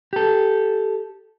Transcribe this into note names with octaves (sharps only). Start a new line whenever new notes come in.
G4 A4